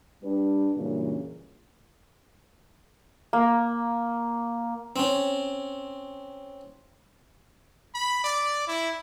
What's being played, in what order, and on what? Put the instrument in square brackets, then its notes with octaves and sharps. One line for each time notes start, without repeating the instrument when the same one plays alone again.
[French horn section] G3 D4 B4
F#2 A#2 C#3 E3 G3 D4
[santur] A#3
[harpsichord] C4 C#4
[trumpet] B5
D5
E4